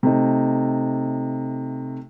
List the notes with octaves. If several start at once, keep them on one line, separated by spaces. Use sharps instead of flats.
C3 A3 D#4